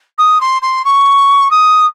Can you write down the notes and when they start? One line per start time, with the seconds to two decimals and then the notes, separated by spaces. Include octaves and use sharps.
0.18 D#6
0.41 C6
0.62 C6
0.85 C#6
1.51 D#6